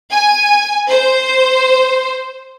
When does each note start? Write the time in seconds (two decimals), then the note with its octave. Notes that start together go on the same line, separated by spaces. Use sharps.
0.10 G#5
0.88 C5